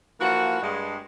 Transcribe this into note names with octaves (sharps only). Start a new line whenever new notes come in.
E3 F3 A#3 F#4
G2 G#3